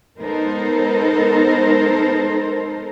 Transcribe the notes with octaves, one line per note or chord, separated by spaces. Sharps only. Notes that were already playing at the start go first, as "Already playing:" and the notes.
G#3 B3 D#4 A4 A#4 C5